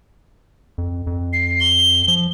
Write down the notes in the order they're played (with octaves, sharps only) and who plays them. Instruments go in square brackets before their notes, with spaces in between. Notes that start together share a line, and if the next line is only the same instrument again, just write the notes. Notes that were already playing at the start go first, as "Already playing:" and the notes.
[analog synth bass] F2
F2
[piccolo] C7
G7
[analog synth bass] F3